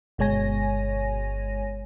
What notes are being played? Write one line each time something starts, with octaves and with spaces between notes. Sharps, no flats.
G1 B2 G#3 C#5 G#5 A#6